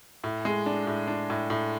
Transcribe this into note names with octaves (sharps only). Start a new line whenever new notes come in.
A2
G#3
D4
A2
D4
A2
A2